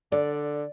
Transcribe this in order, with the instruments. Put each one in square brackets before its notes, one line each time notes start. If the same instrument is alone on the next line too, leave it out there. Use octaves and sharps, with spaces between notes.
[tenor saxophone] D3 [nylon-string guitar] D5